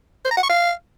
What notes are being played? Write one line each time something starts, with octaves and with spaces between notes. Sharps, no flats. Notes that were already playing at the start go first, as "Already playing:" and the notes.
C5
A#5
F#5
C#6
F5